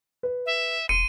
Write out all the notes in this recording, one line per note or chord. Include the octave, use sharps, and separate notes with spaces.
B4
E5
E1 C6 C#7 D#7